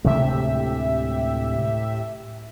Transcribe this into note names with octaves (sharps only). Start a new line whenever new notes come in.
D2 A2 C3 G#3 G4 E5